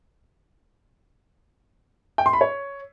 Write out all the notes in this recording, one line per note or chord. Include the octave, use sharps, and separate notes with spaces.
G5
C6
B5
C#5